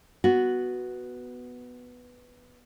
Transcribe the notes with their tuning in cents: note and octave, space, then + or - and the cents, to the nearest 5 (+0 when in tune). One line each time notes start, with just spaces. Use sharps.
B3 +0 F#4 +0